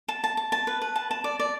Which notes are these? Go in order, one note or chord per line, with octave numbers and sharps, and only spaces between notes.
A5
A5
A5
A5
B4
B4
A5
A5
D5
D5